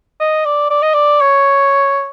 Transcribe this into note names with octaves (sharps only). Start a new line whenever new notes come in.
D#5
D5
D5
D#5
D5
C#5